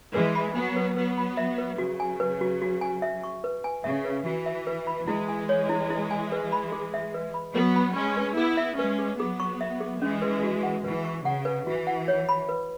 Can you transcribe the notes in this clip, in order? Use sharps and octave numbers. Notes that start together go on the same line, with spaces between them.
E3 G#3 B4
B5
F#3 B3 G#5
B4
F#3 B3 B4
B5
E5
B4
C#3 F#3 F#4
G#5
B4
F#4
F#4
G#5
E5
C#6
B4
G#5
C#3 E5
B4
E3 F#4
E5
B4
B5
E3 G#3 E4
G#5
C#5
E4
E4
G#5
B4
B5
G#4
E5
B4
B5
F#3 B3 B4
B5
G#3 C#4 G#5
B4
B3 E4 G#4
E5
G#3 C#4 B4
G#4
F#3 B3 G#4
C#6
E5
G#4
E3 G#3 C#4
B4
F#4
F#5
E3 B4
C#6
C#3 F#5
B4
E3 F#4
F#5
C#5
B5
B4